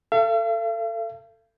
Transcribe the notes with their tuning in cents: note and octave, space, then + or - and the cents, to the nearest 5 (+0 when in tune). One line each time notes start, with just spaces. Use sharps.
A4 +20 F5 -45